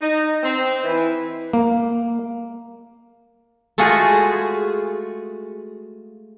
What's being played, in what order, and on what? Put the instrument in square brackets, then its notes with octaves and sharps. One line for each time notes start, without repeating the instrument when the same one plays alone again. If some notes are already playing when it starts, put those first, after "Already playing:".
[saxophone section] D#4
C4
E3
[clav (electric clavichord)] A#3
[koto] G#3 A3 F4 F#4 G#4